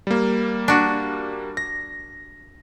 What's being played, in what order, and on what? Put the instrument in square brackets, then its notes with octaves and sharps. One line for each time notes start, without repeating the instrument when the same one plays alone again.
[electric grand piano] G3 A#3
[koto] D4 F#4
[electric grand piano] A#6